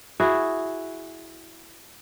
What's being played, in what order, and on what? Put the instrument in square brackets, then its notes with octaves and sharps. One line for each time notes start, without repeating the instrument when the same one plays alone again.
[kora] E4 F#4 G#4